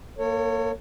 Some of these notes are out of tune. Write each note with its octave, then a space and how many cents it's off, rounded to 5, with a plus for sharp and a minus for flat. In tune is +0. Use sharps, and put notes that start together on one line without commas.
A#3 +0 A4 +45 C#5 -5